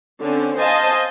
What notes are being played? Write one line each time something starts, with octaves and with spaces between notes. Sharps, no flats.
D3 C4 C#4
C5 D#5 F5 G#5 A5